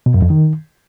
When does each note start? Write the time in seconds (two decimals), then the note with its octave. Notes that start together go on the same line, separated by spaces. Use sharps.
0.06 B2
0.14 F#2
0.22 F2
0.30 D#3